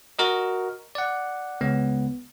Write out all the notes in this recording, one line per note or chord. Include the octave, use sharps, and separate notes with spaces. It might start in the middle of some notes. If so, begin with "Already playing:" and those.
F#4 A#4 D#5
D5 F#5
C#2 B3